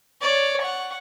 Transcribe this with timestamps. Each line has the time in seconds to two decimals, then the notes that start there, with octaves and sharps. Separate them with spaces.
0.21 C#5 D5
0.61 F#5 C#6